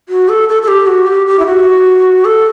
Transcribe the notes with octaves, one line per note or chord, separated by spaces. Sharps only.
F#4
A4
A4
A4
G4
F#4
G4
G4
E4
F#4
A4